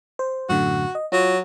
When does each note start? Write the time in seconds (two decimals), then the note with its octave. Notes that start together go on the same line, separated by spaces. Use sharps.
0.19 C5
0.49 F#2 A2 D3 F#4
0.95 D#5
1.12 F#3 F4